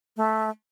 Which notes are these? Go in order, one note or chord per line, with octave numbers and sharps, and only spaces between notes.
A3